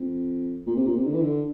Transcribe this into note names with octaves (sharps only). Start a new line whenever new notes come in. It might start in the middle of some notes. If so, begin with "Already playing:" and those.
Already playing: F2
A#2
C3
A#2
C3
D3
E3
D3